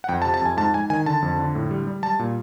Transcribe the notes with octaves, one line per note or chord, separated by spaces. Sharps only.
F#5
F2 G5
A5
C3
A5
F2 G#5
G#2 A5
G#2 G#5
D#3 G#5
D3 A5
F2
D3
A2
G3
G3
G3 A5
A#2